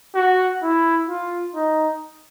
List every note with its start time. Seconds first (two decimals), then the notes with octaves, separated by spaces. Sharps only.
0.15 F#4
0.63 E4
1.09 F4
1.55 D#4